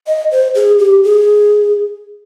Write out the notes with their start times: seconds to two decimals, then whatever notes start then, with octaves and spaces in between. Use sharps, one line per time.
0.07 D#5
0.31 C5
0.55 G#4
0.79 G4
1.04 G#4